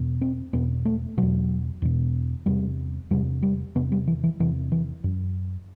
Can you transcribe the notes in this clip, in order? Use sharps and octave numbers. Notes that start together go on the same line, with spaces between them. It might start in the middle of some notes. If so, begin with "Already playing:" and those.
Already playing: E2 B2
C4
E2 B2 B3
A3
E2 B2 F#3
E2 B2
E2 C3 G3
E2 C3 G3
G3
E2 C3 B3
G3
E3
E3
E2 C3 E3
E3
F#2